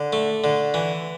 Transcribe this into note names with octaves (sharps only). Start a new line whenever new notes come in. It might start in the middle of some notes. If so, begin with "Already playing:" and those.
Already playing: D3
A3
D3
E3